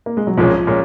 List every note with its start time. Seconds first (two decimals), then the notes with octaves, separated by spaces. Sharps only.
0.06 A#3
0.17 G#3
0.27 F#3
0.37 C2 A#2 F3 G#3 C#4
0.67 A#2 G#3 C#4